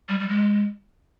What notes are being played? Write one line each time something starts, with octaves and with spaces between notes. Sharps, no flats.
G3
G3
G#3